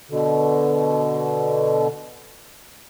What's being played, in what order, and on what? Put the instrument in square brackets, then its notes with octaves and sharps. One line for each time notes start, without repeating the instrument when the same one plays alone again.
[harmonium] B2 D3